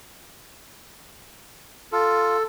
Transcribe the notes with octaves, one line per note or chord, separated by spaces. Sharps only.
F4 A4